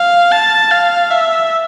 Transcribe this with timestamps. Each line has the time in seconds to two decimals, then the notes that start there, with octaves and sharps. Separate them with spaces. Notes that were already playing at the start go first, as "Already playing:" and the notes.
Already playing: F5
0.32 A5
0.71 F5
1.11 E5